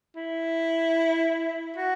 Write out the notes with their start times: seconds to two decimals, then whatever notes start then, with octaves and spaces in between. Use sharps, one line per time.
0.16 E4
1.76 F#4